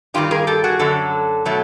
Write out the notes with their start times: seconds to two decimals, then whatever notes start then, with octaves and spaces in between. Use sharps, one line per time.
0.14 G2 D#3 G3 F4 G4
0.31 G#4 A#4
0.47 G4 A4
0.64 F#4 G#4
0.79 F#2 D3 F#3 A4
1.45 B2 F#3 A3